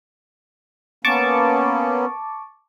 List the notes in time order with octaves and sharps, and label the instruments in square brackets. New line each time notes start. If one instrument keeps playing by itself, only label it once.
[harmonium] A#3 B3 C#4 [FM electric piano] A5 C#6 D6